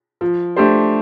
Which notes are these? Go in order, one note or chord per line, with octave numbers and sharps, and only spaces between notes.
F3
A3 D4 G4 C5